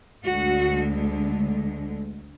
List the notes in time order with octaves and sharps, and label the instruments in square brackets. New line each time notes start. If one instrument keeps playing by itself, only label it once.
[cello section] D2 D3 G#3 F#4